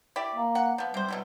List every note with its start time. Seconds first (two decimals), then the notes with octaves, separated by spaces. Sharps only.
0.16 E4 G4 D5
0.36 A#3
0.55 F#5
0.78 F3 B3
0.94 C3 G3 C5
1.08 B2 F#3 E4